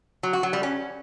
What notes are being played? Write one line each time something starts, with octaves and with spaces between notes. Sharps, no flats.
F#3
F#4
F#3
G3
C#4